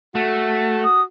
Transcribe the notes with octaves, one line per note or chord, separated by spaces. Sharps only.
A3 F#4
D#6